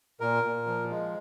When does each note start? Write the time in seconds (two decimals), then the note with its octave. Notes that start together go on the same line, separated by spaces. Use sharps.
0.20 A#2 A#4
0.43 A#2
0.67 F3
0.90 G#3